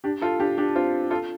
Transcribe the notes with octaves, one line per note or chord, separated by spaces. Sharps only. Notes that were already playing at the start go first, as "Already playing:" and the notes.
D4 G4
F4 A4
D4 G4
D4 G4
C4 F4
F4 A4